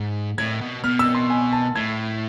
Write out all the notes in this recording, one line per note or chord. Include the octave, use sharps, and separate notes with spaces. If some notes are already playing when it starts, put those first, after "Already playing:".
Already playing: G#2
A2 G#6
B2
B2 F6
E6
C6
G#5
A5
A2 G#6